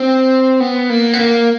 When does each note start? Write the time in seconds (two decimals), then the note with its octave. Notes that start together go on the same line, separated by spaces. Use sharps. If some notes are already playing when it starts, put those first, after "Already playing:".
Already playing: C4
0.60 B3
0.90 A#3
1.13 B3
1.19 A#3